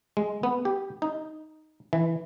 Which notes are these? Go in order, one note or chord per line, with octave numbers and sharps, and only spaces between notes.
G#3
B3
G4
D#4
E3